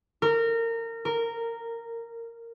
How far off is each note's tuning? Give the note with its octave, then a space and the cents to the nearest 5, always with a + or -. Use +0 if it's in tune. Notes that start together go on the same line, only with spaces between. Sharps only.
A#4 -25
A#4 -10